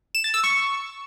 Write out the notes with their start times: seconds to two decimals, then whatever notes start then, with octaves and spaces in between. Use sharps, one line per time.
0.15 E7
0.24 A6
0.34 E6
0.44 C#6